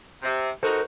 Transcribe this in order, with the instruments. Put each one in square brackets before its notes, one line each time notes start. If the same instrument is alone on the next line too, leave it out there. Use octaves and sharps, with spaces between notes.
[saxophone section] C3
[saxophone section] D#4 F#4 [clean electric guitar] A4 A#4 C5